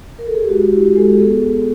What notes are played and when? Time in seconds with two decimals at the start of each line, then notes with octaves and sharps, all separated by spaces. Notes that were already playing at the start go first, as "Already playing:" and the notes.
0.19 A#4
0.27 A4
0.35 G#4
0.42 G4
0.49 G#3 F#4
0.73 E4 G4
0.96 G#3 A4
1.13 G#4
1.19 B3 A4